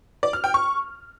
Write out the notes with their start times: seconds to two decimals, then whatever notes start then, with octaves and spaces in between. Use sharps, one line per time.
0.23 D5
0.33 F6
0.44 G5
0.54 C#6